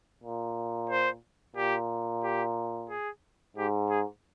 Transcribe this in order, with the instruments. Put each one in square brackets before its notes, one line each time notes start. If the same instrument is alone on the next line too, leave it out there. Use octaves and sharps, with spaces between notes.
[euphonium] A#2
[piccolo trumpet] C5
[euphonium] A#2 [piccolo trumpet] G4
[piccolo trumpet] G4
G#4
[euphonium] G#2 [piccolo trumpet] G4
[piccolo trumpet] G#4